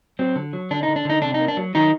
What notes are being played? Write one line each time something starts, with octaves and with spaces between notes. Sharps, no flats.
F#3 C4
D3
F#3
D3 D4
D#4
D3
D4
D3 D#4
C3 D4
D#4
A#3
D4
F#3
D#3 F#3 D#4